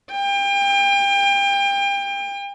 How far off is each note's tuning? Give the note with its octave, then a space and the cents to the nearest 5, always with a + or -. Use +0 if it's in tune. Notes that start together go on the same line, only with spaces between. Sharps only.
G5 +30